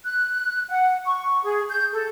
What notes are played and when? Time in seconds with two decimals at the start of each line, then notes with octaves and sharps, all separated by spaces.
0.04 F#6
0.68 F#5
1.05 C#6
1.43 G#4
1.68 G6
1.92 A4